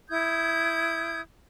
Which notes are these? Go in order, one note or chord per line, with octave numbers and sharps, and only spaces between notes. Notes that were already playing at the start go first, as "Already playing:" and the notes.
E4 D#6 G6 G#6